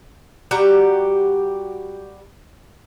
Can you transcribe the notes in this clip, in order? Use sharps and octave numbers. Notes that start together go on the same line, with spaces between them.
G3 F#4 G4 A#5